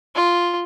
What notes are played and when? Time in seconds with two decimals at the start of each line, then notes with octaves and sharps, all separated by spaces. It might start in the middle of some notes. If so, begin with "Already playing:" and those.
0.15 F4